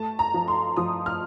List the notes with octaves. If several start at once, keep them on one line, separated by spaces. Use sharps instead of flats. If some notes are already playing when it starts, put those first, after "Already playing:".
Already playing: A3 A5
A#5
F3
C6
F3 D#6
F6